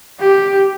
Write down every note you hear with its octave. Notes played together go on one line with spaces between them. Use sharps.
G4